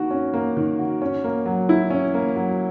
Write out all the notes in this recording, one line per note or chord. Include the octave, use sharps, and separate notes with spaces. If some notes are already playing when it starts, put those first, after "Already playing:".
Already playing: D#3 A#3 F#4
C#4
A#3
D#3
F#4
C#4
A#3
F#3
E4
C#4
A#3
F#3